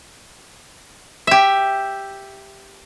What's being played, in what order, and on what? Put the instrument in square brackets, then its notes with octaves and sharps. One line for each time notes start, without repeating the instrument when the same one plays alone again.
[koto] G4 E5